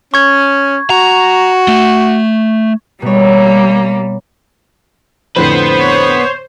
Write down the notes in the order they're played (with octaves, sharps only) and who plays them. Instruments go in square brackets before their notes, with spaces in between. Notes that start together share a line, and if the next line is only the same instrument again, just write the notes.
[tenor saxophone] C#4 [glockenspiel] C#6 G#6
[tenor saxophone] F#4 [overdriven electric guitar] A#5
[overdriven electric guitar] A3
[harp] B2 C#5 [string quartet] G3 A#3
[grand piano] F2 A2 D3 [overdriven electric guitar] B3 B4 [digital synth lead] C5
[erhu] C#5